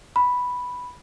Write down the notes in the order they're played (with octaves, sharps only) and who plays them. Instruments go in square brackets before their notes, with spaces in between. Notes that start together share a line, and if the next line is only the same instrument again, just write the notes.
[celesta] B5